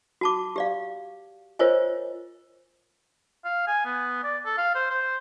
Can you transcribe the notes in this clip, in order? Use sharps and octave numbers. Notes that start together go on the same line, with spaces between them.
F#4 A5 D6
G4 D5 F5
F4 A#4 C5 C#5 D#5 G#5
F5
G#5
B3
D5
A4
F5
C5
C5